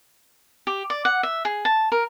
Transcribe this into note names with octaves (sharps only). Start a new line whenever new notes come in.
G4
D5
F#5
E5
G#4
A5
A#4